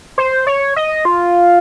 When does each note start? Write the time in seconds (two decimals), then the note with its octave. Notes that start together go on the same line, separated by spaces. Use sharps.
0.18 C5
0.47 C#5
0.76 D#5
1.05 F4